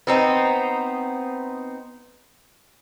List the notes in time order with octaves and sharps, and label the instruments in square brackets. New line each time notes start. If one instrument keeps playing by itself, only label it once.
[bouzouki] B3 C4 D#4